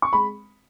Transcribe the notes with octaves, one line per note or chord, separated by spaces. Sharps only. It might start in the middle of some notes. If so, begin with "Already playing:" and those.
C#6
G#3 B5